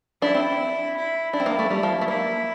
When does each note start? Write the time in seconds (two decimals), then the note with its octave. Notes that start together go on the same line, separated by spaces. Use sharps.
0.22 D4 E4
0.34 C4
0.96 E4
1.33 D4 E4
1.40 C4
1.46 A#3
1.59 A3
1.70 G3
1.83 F3
2.01 A3
2.08 A#3 E4